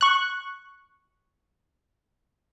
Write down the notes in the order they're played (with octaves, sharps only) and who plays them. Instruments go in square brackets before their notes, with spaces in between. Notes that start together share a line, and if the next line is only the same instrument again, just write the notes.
[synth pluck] C#6 F#6